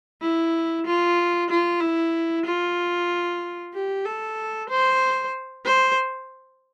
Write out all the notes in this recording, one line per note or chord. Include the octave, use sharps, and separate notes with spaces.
E4
F4
F4
E4
F4
G4
A4
C5
C5